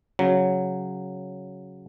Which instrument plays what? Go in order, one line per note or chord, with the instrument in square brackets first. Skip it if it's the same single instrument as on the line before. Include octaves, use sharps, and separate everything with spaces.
[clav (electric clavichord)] C#3 F#3